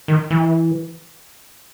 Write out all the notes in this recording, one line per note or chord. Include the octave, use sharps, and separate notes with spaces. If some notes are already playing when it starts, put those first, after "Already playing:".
D#3
E3